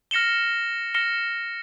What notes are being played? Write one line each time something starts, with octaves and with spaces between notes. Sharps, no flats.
F6 A#6 C#7 E7 G7
F6 A#6 C#7 E7 G7